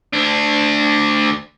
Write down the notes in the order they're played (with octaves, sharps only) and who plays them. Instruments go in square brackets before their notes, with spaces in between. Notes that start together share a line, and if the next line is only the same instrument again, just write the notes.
[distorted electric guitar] D2 D4